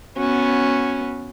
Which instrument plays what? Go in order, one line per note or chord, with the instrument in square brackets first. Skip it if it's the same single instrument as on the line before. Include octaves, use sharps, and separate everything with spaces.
[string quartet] B3 C#4 F#4